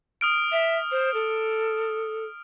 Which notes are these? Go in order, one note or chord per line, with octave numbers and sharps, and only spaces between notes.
D#6 F6 D7
E5
C5
A4